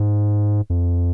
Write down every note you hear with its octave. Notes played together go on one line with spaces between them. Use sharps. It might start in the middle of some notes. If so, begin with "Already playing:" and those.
Already playing: G#2
F2